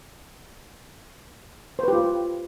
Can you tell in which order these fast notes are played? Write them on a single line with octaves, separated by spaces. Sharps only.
C5 B4 G4 F4